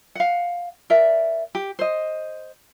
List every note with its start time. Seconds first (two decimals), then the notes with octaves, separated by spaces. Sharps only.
0.15 F5 F#5
0.90 A#4 D5 E5
1.55 G4
1.79 C5 D#5